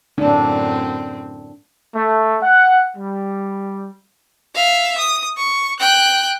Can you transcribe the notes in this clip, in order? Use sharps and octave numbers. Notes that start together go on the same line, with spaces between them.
F#2 A2 C4 D4
A3
F#5
G3
E5 F5
D#6
C#6
G5 F#6